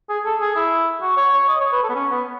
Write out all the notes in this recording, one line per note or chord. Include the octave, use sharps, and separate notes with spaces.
G#4
A4
G#4
E4
F#4
C#5
C#5
D#5
C#5
B4
A4
B3
C#4
B3